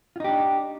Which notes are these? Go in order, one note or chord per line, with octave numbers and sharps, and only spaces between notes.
D4 D#4 F4 G4